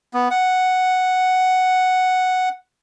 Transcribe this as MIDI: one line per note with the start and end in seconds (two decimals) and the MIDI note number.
0.14 0.28 59
0.31 2.49 78